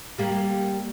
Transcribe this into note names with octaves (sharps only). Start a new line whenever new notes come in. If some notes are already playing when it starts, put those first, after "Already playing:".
G3 A#3